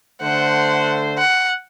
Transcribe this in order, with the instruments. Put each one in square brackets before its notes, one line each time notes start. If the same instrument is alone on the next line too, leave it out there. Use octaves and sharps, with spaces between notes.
[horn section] D3 A3 C5 [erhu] F#5
[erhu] F#5